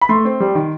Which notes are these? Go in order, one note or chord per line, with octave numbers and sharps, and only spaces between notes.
B5
A3 C6
C4
G3
D#3